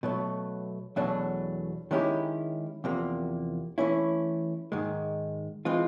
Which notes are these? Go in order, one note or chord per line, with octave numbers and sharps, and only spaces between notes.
B2 F#3 A3
E2 B2 F#3 A3 D4
D#3 G#3 C#4 E4 G4
E2 C3 F3 A#3
E3 A3 C#4 E4
G#2 D#3 G#3
E3 G#3 C4 F4